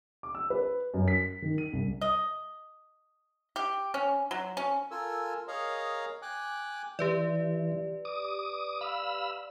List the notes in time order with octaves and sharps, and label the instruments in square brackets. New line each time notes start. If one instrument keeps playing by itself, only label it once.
[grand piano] D6
E6
B4
F#2
B6
D#3
D#7
C2
[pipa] D#5
G4
C#4
F#3
C#4
[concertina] F4 A4 A#4 G#5 E6
G#4 A#4 C#5 D#5 F5 A#5
G5 G#5 D6 F#6
[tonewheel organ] E3 [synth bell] G4 B4 D5
[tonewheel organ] D6 D#6
F5 B5 E6